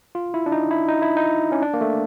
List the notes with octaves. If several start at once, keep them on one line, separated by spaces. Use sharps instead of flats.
F4
E4
D4
D#4
E4
D#4
E4
D#4
C#4
D4
A#3
A3